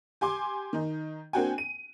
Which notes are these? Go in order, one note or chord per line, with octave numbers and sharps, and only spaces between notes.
G4 G#5 C6 D6
D#3 D#4
A#3 C4 D4 F#4 G5 G#5
D#7